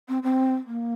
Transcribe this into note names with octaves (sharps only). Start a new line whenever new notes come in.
C4
C4
A#3